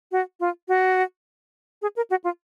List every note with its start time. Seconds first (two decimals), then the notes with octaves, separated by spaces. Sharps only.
0.12 F#4
0.40 F4
0.68 F#4
1.82 G#4
1.96 A#4
2.10 F#4
2.24 F4